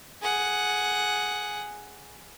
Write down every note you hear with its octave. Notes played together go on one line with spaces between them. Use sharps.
G#4 F#5